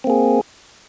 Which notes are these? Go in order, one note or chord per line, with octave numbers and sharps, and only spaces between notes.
A#3 C4 G#4